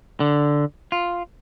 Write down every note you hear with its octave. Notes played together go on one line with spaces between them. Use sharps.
D3
F4